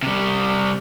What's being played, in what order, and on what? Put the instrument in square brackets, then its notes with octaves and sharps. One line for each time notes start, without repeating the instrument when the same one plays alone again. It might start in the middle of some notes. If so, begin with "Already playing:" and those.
[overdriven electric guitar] C3 G3